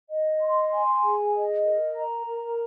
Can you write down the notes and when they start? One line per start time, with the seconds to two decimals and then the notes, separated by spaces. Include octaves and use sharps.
0.09 D#5
0.41 C6
0.71 G#5
1.03 G#4
1.34 D#5
1.64 A#4
1.96 A#5
2.27 A#4